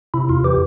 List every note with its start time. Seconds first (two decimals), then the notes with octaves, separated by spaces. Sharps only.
0.14 C3 E4
0.29 E2 F4
0.44 E3 G4